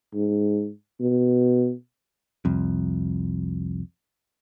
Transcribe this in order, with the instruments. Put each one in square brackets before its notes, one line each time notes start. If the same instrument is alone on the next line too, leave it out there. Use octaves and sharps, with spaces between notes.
[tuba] G#2
B2
[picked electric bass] C2 F2